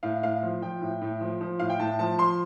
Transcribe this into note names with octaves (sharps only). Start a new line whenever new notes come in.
A2 F5
A2 F5
F3
F3 G5
A2
A2
F3
F3
A2 F5
G5
A2 A5
F3 A5
F3 C6